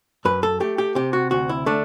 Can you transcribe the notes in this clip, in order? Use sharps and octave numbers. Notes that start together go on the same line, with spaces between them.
F#2 B4
A4
A3 G4
G4
C3 G4
F#4
D2 F#4
E4
A3 D4